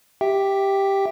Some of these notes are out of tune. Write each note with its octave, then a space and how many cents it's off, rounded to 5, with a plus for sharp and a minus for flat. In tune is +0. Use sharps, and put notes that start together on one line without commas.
G4 +0 E5 +0 G5 +0